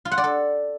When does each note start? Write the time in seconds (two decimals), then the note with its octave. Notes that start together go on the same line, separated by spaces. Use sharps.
0.05 F4
0.11 F#5
0.18 D5
0.24 A4